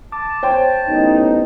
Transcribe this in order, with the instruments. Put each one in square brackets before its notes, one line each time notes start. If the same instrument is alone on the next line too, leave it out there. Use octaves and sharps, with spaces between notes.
[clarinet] A5 [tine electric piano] D6
[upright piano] C5 G5 [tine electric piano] C#5
[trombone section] A1 B3 D#4